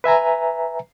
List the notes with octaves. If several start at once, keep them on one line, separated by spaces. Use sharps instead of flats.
B4 E5 G#5 A#5